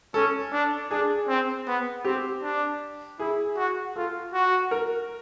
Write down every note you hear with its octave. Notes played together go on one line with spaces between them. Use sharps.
C#4 A4
D4
D4 G#4
C4
B3
C4 G4
D4
E4 G#4
F#4
F4 A4
F#4
A#4